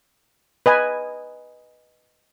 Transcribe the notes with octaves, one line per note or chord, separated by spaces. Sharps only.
B4 D#5 G#5